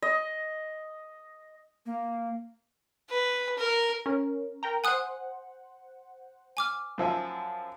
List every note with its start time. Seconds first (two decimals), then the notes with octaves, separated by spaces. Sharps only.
0.02 D#5
1.86 A#3
3.10 B4
3.58 A#4
4.06 C#4 A#4
4.63 A#4 G5 A#5
4.84 C5 F#5 G#5 D#6 F#6
6.57 G#5 D6 F6
6.98 F#2 F3 E5 G#5